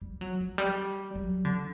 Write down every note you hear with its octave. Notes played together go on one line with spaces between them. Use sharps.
G3
F#3
F#3
G3
F#3
D3